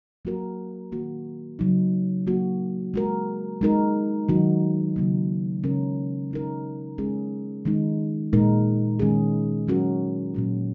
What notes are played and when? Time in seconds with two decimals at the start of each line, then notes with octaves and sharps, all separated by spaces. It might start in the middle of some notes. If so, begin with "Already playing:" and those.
0.25 F#3 A#3 F#4 A#4
0.92 D#3 A#3 F#4
1.59 C#3 F#3 D#4
2.27 F#3 A#3 F#4
2.94 G#3 F#4 A#4
3.61 G#3 D#4 A#4
4.29 D#3 F#3 D#4 F#4
4.96 C#3 F#3 A#3
5.63 C#3 G#3 C#4 A#4
6.31 G#3 D#4 A#4
6.98 G#3 C#4 G#4
7.65 D#3 G#3 D#4
8.33 A#2 G#3 D#4 A#4
8.99 D#3 G#3 C#4 G#4
9.67 F#3 C#4 F#4 A#4
10.34 A#2 F#3 C#4 F#4